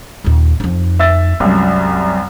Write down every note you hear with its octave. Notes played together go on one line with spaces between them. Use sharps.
D#2 A#2
F2 D#4
E5 E6 A6
C2 F#2 G#3